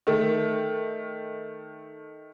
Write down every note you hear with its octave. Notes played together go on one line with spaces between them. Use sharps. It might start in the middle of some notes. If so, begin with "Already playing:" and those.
D#3 A3